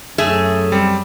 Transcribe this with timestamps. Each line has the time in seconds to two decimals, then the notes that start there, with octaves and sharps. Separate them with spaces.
0.18 F#2 A3 G#4 E5
0.72 G3 C4